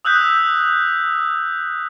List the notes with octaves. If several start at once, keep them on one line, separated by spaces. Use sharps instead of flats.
D#6 E6 F#6 G6 B6